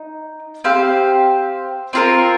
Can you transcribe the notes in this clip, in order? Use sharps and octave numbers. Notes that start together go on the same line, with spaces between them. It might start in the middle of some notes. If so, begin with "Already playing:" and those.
Already playing: D#4
C4 G4 C5 F5
C4 F4 A#4